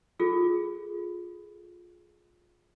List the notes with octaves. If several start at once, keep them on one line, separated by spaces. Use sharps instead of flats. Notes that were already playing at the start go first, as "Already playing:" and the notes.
F4 G#4 A4